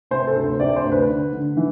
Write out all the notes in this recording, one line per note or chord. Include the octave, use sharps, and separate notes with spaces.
C3 C5
A4
D2
C5
C3 D5
C5
D2
B4
D3
D3
E3